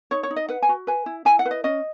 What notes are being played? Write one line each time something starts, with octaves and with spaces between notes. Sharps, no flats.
D#4 C#5
C#5
D#4
D#5
B4 F#5
G#5
F#4
B4 G#5
E4
E4 G#5
F#5
B4
D#5
C#4 D#5